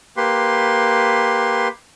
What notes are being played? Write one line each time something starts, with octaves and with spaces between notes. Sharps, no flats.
A#3 G4 B4 C6